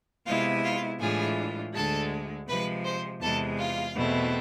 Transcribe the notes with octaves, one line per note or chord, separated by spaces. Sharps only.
C3 G#3 B3 E4 F4 F5
F4 F5
A2 E3 G#3 D4 F4 G#4 G#5
D2 D3 G#3 A4 A5
C3 F3 G#3 B4 B5
C5 C6
E2 C3 G#3 A4 A5
F4 F5
E2 B2 A3 C4 E4